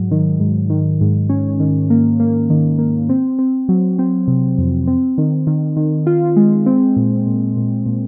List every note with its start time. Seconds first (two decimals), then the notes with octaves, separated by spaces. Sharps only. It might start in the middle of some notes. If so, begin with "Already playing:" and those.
Already playing: G#2 F#3
0.11 D#3
0.40 G#2
0.70 D#3
1.01 G#2
1.29 C#4
1.60 D#3
1.90 A#3
2.20 A#3
2.50 D#3
2.79 A#3
3.09 C4
3.39 C4
3.69 F#3
3.99 C4
4.28 C3
4.58 F2
4.87 C4
5.18 D#3
5.47 D#3
5.77 D#3
6.07 F4
6.36 G#3
6.66 C4
6.96 A#2
7.26 A#2
7.57 A#2
7.86 A#2